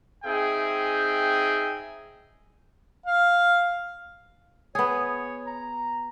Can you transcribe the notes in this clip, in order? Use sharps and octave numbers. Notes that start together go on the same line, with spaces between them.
C4 D#4 G#4 E5 G5
F5
B3 G#4 C#5
A#5